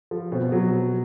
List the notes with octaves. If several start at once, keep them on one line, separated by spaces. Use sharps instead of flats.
F3
B2 C4
F#3
B2